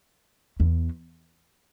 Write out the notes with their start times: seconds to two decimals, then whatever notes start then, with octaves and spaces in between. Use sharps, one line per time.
0.60 E2